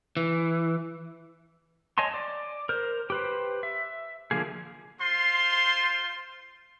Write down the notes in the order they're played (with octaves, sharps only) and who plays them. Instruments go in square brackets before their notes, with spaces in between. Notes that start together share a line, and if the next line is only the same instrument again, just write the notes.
[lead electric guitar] E3
[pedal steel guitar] C#5 D#5 G#5 A5 C6
D5
A#4 C5
G4 B4 C5
E5
D3 F3 A#3 G#4
[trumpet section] F4 C5 C6